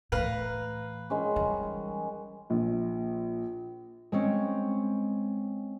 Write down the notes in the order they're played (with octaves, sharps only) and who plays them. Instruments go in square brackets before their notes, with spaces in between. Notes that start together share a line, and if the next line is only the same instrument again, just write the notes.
[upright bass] A2 E3 [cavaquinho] B4 F5 A#5
[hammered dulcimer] D#3 G#3 C#4
[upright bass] E3 G3
[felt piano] A#1
[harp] G#3 C4 C#4